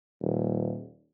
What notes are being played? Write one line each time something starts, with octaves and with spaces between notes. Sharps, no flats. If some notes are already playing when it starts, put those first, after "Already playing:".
D#1